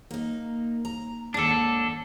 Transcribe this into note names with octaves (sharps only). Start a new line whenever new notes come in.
A#3 D#4
A#5
D#2 G#2 D4 A4